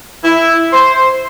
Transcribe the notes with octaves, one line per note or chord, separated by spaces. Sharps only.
E4
C5